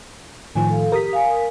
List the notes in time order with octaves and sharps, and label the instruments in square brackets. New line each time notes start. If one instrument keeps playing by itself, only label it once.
[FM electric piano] A2 D#3 F3 [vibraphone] G#5
[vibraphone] A4 F5
[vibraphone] G4 [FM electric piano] A#4 D#6 B6
[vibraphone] F5 G#5